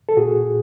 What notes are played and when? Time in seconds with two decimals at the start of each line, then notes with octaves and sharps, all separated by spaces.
0.09 A4
0.17 A#2 F#4 G#4